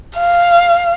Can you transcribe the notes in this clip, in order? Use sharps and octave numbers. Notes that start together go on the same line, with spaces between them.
F5